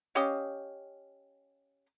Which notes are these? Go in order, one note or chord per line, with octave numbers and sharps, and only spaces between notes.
C#4 G4 D#5 F5